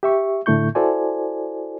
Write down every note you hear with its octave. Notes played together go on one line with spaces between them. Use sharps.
G4 E5 C#6
A2 D3 A3 E4 C#6 G6
E4 F#4 A4 C5 D5 G#5